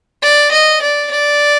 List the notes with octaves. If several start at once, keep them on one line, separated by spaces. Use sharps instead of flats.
D5
D#5
D5
D5